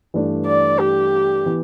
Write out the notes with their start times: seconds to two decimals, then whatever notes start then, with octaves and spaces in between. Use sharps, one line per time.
0.14 G2 E3 A3 D4
0.46 D5
0.79 G4
1.46 E3 B3